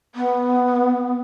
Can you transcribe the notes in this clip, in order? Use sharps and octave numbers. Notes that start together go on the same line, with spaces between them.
B3